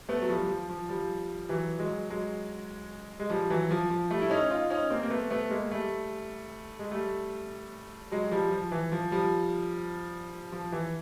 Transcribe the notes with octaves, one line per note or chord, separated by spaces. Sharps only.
A3 B3
F#3
F3 G3
F3
F3
F3 G3
E3 F#3
F#3 G#3
F#3 G#3
G#3
F3 G3
E3 F#3
F3
F3
G3 A3
E4
C#4 D#4
D#4 F4
C#4 D#4
A#3 C4
A#3
A3 B3
A3 B3
G#3 A#3
G3 A3
G#3
G3 A3
F#3 G#3
F3 G3
F3
E3
F3
F3 G3
F3
E3